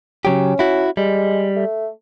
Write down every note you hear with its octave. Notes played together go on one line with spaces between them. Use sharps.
C#3 F#3 C#4 G4
E4 F#4
G3 G#3
A3